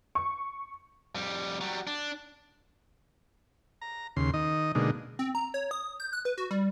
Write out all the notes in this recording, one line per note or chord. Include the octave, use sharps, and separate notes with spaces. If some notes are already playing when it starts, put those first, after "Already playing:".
C#6
F2 G3
F#3 G3
D4
A#5
D#2 C#3 C6
D#3 D#5
B2 D3 G#3 A#3 D#4
C4
A#5
C#5
D#6
G6
F#6
B4
F#4
G3